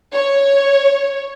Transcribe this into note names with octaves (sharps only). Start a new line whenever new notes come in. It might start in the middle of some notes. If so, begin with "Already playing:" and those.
C#5